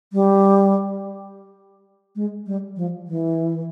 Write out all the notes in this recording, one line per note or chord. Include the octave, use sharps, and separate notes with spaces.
G3
G#3
G3
F3
E3